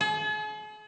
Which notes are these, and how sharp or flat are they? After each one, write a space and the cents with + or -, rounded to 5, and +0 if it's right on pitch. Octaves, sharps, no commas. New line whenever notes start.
G#4 +45